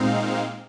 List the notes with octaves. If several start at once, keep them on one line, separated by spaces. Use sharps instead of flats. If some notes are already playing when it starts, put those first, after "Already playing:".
Already playing: A#2 G#3 C4 D#4 F5